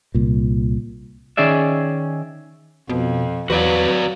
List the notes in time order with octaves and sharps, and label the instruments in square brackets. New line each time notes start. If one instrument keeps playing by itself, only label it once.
[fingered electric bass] C2 A#2
[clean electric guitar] D#3 C#4 G#4 D5 E5
[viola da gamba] F2 [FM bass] B2
[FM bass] E2 [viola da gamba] F#3 [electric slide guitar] F#4 D5 F5 [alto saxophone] B4